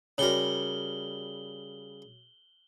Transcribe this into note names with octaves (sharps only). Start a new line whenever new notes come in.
C#3 G3 F#4 A#4 C#5 F#7 G7